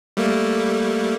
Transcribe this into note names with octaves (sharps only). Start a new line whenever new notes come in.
G3 A3 A#3